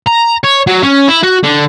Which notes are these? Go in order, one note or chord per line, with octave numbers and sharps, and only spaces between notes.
A#5
C#5
F#3
C#4
E4
F#4
D3